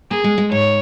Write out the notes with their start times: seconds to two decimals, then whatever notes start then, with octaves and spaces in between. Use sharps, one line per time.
0.11 A#3 G#4
0.24 G#3
0.38 G#3
0.52 G#2 C#5